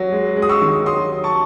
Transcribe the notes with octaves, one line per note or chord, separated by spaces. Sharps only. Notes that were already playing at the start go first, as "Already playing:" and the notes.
Already playing: F#3
G#3
G#3
D#6
C#6 E6
D#3
F#3 C6 D#6
F#3
A5 C#6